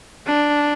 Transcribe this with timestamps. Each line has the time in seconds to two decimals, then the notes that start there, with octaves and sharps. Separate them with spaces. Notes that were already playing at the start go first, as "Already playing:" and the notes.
0.27 D4